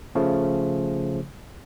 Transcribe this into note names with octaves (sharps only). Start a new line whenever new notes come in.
C#3 F3 A3